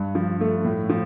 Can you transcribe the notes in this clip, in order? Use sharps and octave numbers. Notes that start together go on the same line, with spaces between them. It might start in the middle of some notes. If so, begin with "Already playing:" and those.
Already playing: G2
F3
A3
A2
F3